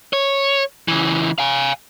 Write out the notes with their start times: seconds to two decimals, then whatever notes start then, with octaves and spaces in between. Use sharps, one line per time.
0.13 C#5
0.88 C#3 E3
1.39 F5 G#5